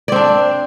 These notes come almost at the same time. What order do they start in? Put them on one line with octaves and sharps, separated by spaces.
D5 C4 D4